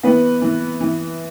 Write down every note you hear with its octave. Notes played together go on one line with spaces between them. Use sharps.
E3 B3 B4
E3
E3